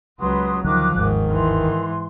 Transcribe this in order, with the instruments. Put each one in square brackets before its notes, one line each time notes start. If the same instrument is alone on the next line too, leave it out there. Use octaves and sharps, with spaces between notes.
[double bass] C#2 F#3 [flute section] B4 C6 D#6
[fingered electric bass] D2 D3 F#3 [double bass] D#3 F3 [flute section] D6 F#6
[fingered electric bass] G1 D#2 [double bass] G#2 [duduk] D#3
[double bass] G#2 E3 [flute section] C6